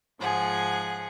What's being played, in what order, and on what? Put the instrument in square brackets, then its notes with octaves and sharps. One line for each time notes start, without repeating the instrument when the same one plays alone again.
[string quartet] G#2 F3 G#4 F#5